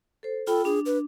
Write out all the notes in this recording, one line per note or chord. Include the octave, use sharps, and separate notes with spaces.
A4 C5
F4 A4 G5 B5
D4 G#4
B4